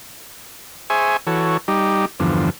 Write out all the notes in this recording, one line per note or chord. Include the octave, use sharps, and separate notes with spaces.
G#4 C5 E5 G#5 C#6
E3 F#4 A4 C#5
G3 D#4 G4
E2 G2 D3 F3